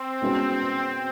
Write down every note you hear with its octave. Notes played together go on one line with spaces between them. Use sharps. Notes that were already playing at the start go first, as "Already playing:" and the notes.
Already playing: C4
B2 G#3 C#4 F#4 B4